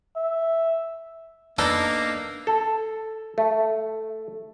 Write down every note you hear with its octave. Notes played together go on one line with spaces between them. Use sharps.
E5
A#3 B3 D4 D#4 A4
A4
A3